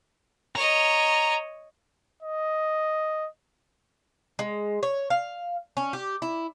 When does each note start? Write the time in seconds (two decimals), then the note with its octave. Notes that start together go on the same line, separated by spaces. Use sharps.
0.55 C#5 D#5 A#5
2.23 D#5
4.39 G#3
4.83 C#5
5.10 F5
5.77 C#4
5.93 G4
6.22 E4